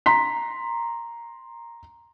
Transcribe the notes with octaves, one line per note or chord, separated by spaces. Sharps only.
A#5 C6 B6